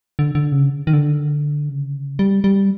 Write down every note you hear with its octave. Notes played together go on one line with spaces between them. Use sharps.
D3
D3
C#3
D#3
D3
C#3
G3
G3